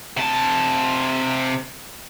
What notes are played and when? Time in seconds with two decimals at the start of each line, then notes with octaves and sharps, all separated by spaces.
0.17 C3 A5